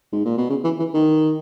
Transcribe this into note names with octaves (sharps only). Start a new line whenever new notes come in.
G#2
A#2
B2
C#3
E3
E3
D#3